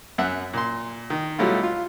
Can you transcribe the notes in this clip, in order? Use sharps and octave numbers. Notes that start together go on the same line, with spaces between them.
F#2 E5 F#5
A#2 C6
D#3
B2 F#3 G3 A3 E4 F4
F4